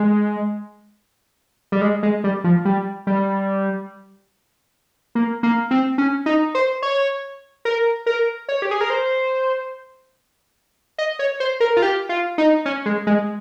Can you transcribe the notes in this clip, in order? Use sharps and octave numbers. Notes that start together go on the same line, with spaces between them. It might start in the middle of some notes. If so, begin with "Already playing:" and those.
Already playing: G#3
G3
G#3
G#3
G3
F3
G3
G3
A#3
A#3
C4
C#4
D#4
C5
C#5
A#4
A#4
C#5
G4
G#4
A#4
C5
D#5
C#5
C5
A#4
F4
G4
F4
D#4
C#4
G#3
G#3